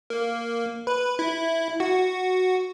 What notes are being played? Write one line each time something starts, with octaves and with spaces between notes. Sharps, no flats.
A#3
B4
E4
F#4